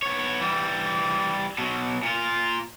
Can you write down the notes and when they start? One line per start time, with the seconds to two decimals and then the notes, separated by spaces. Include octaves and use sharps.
0.02 B3 C#5
0.41 E3 G3
1.58 B2 F#3
2.03 A#2 F4